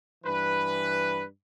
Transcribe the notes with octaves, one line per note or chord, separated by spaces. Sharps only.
G2 E3 B4